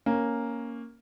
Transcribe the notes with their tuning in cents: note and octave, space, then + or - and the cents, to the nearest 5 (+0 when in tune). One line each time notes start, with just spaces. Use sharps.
A#3 +0 C#4 +0